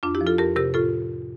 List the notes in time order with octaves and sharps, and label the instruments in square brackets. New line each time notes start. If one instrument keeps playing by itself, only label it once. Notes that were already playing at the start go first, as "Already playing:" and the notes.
[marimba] F2 D4 F4
E4 G4
F3
F4 A4
F2 G4 A#4
C3 G4 A#4
A2 F4 A4